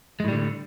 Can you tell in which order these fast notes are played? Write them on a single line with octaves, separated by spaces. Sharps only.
G#3 A2 G3 D3